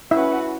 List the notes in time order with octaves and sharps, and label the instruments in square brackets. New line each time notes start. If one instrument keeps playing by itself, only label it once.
[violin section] C#4 F#4 B4 F#5 [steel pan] E4 E5